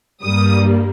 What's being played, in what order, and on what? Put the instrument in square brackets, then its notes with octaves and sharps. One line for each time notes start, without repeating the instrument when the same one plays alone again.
[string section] G2 G3 A#3 D#6